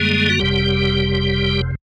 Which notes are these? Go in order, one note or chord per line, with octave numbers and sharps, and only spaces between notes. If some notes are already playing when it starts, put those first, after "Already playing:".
Already playing: F#2 D3 G3 G#3 A#3 G#4
F#4
F#1 F2 C3 G3 G4